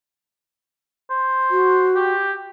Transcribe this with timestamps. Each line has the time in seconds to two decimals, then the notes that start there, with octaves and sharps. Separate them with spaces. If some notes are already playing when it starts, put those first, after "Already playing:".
1.10 C5
1.51 F#4
1.95 G4